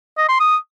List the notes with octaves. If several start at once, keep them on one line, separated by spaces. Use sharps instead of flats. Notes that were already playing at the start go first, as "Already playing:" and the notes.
D#5
C6
D#6